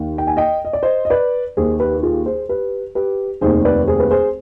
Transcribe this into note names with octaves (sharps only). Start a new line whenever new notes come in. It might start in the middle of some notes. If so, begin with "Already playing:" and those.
Already playing: D#2 D#3
G5
G#5
D#5 G5
D#5
D5
C5 D#5
D#5
B4 D5
D#2 D#3 G#4 C5
G4 B4
G4
F4 G#4
G#4 C5
G4 B4
G4 B4
F1 D#2 D#3 G#4 C5
B4 D5
G#4 C5
B4
G#4 C5